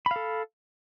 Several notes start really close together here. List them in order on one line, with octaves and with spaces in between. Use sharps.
B5 F5 A4